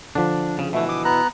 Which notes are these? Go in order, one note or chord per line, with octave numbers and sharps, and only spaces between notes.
D3 F3 D4
C#3
B2 E3 A3
D6 D#6
B3 A#5 F#6